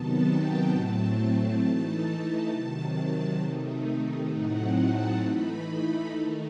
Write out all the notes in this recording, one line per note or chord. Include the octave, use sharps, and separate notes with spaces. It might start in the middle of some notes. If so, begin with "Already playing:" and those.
Already playing: C3 D#3 F#3 B3 D#4 A5
G5
A2 F#3 A3 C4 A5
E3 A3 D#4
C3 D#3 F#3
C3 D#3 A3 D#4
A2 F#3 A3 C4 D#4 F#5
A5
E3 A3 D#4 B5
D#3 A3 D#4